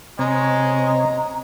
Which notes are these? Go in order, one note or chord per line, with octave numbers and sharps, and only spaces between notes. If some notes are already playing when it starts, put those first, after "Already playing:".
C3 G#3 C4 C#5 D#5 A#5